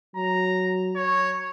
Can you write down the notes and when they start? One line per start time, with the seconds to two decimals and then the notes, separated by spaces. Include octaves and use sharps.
0.16 F#3 A#5
0.95 C#5